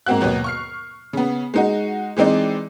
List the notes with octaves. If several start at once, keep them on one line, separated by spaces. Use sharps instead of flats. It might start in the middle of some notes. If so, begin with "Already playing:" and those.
G#2 A#3 C4 F#4 F#6
D#2 B2 F#3 B3
C#6 F6 C7
C#3 B3
G#3 D#4 F#4
E3 G#3 C4 D#4 D5